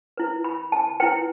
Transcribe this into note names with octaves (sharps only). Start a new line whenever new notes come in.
E4 B4
B5
A5
E4 B4 G5